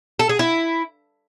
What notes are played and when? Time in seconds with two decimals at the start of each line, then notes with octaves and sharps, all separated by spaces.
0.19 A4
0.29 G#4
0.39 E4